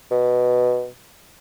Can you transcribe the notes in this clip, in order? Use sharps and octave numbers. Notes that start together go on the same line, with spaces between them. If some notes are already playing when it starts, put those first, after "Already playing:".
B2